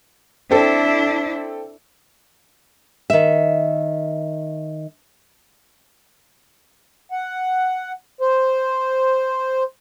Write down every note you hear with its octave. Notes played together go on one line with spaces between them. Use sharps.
C4 D4 E4 A4
D#3 E5
F#5
C5